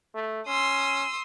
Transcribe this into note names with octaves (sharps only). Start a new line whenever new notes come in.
A3
C#4 C6 D#6 E6